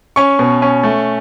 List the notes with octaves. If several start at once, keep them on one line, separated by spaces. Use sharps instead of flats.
C#4 C#6
B2
C#4
A3